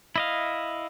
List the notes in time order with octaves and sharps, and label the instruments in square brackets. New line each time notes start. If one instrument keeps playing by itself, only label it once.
[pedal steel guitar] E4 D#5 F5